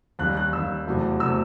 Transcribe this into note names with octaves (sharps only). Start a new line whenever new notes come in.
D#2 D#3 G3 F#6
F#6
D#2 D#3 G3 E6
E2 C3 F#3 A3
C3 F#3 A3 E6